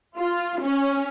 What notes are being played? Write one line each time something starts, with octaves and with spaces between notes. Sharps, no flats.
F4
C#4